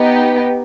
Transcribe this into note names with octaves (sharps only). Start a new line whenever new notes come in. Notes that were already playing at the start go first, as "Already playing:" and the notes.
Already playing: B3 D#4 G4